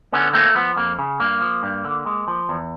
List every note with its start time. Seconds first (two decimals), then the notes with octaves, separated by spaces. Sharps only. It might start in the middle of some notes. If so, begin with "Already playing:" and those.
0.12 D3 B3 C#4
0.33 A3 A#3 C4
0.55 F3 B3
0.77 F2 A#3
0.99 C#3
1.20 G2 A#3
1.41 F3
1.63 G2
1.85 D3
2.06 G#3
2.28 F3
2.49 E2